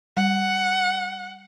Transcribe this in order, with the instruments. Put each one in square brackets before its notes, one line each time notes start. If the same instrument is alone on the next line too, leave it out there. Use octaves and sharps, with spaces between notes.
[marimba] G3 [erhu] F#5